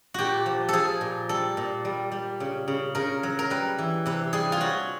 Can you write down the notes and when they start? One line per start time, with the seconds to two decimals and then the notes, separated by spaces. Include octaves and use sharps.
0.14 A#2 F#4 G4
0.46 F3
0.69 F3 G#4 A4
1.01 A#2
1.29 G3 A4
1.57 A#2
1.85 G3
2.11 G3
2.40 C#3
2.68 C#3
2.95 C#3 A#4
3.23 F#3
3.39 A#4
3.50 G3 B4
3.79 E3
4.06 C3 B4
4.33 G3 G#4
4.52 F4
4.61 F#3 F#4